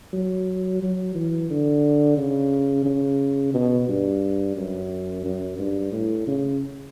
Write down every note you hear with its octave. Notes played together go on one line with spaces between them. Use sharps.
F#3
F#3
E3
D3
C#3
C#3
B2
G2
F#2
F#2
G2
A2
C#3